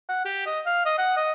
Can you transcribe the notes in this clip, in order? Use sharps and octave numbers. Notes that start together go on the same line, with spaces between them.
F#5
G4
D#5
F5
D#5
F#5
D#5